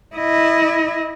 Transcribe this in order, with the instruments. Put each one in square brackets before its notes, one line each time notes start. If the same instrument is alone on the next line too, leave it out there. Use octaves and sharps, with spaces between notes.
[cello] E4 D#5